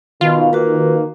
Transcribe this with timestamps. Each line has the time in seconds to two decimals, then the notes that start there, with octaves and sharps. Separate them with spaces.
0.21 B2 D#3 F4 F5
0.53 A#3 F#4 B4